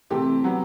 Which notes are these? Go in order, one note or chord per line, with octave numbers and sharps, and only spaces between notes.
C3 E3 A3 C4 G4
F#3 B3